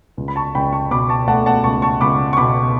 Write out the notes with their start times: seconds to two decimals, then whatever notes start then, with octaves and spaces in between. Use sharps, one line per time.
0.17 C#2
0.28 B5
0.36 A5 C#6
0.55 C#2 G5 B5
0.73 A5 C#6
0.91 B2 B5 D6
1.09 A5 C#6
1.28 A3 F#5 A5
1.46 F#5 A5
1.64 C#2 A5 C#6
1.82 A5 C#6
2.01 C#2 B5 D6
2.33 C#6
2.37 B2 B5 D6